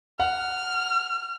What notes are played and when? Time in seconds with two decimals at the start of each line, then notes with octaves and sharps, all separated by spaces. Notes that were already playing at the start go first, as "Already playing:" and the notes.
0.20 F#5 F6